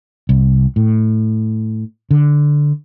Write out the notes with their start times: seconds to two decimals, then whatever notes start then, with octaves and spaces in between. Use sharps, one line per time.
0.29 C2
0.76 A2
2.11 D3